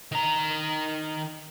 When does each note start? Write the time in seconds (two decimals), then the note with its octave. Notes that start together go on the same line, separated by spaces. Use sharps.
0.12 D#3 A#5